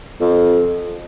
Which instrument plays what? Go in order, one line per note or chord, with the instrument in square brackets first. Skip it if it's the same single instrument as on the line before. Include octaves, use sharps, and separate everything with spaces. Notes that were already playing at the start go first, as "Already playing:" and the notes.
[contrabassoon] F2